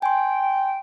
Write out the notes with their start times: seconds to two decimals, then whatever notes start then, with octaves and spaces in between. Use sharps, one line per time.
0.02 G5 G#5 C6